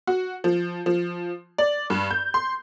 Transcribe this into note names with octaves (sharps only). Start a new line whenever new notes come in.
F#4
F3
F3
D5
G2
G6
C6